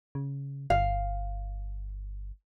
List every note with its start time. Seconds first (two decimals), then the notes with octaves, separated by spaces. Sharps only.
0.15 C#3
0.70 G1 F5